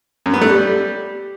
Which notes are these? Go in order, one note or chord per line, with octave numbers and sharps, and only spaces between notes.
F#2
B3
A3
G3